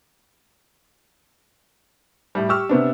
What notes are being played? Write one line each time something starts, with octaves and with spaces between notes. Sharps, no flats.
A2 G3
G4 C#6 E6 F6
C3 B3 D4